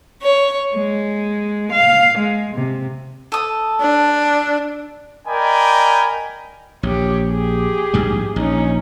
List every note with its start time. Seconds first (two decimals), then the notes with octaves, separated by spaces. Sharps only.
0.21 C#5
0.72 G#3
1.71 F5
2.17 G#3
2.53 C3
3.32 A4 D#6
3.81 D4
5.27 A#4 D5 D#5 G5 G#5 B5
6.83 A#1 G4 C#5
7.31 G4 G#4
7.94 A#1 G#2 G3
8.36 A#1 C#4 D#4